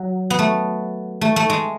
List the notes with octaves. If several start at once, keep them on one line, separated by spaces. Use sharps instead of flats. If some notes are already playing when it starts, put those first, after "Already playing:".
Already playing: F#3
B3
A3
A3
A3
G#3